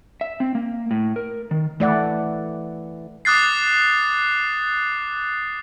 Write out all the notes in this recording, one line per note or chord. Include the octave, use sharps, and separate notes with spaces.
E5
C4
A#3
A2
A#4
D#3
E3 A3 D5 F#5
D6 D#6 F#6 A6 C7